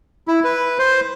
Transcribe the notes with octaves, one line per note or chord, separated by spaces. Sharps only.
E4
B4
C5